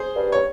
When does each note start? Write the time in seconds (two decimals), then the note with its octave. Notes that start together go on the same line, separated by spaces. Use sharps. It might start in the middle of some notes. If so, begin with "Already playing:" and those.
Already playing: G#4 C5
0.16 G2
0.32 C#5